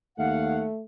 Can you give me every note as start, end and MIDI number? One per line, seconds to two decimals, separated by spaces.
0.18 0.65 39
0.18 0.84 57
0.18 0.60 77
0.18 0.60 78